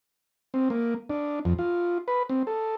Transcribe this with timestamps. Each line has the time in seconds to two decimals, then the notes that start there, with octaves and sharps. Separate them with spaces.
0.54 C4
0.70 A#3
1.10 D4
1.45 F2
1.59 F4
2.08 B4
2.29 C4
2.47 A4